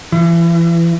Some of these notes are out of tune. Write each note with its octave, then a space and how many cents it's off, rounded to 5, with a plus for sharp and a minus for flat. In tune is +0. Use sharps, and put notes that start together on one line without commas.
E3 +35